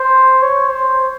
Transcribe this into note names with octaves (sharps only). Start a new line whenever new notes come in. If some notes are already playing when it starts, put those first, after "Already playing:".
Already playing: C5
C#5
C5